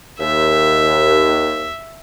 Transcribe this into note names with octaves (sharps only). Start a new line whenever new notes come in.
D#2 E5